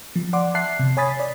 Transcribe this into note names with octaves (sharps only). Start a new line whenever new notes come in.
F3
D5 F#5 C6 D6
E5 A5 F#6 C7
C3
C#5 G#5 B5 D#6 A6 B6
D5